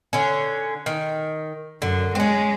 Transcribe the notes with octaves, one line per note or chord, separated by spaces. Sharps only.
D3 C#4
D#3
F#2 D3
G#3 C4 C#4